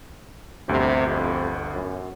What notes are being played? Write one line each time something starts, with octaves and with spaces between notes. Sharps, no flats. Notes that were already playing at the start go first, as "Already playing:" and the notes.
G1 D2 C3 G4
F2
F#2